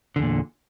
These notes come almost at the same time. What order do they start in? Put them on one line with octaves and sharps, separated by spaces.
D3 E2 A#2